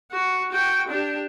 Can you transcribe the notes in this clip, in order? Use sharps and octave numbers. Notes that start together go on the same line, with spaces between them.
F#4
F#4 G5
D4 G4